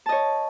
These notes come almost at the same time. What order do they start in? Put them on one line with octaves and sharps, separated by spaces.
A5 D#5 C#5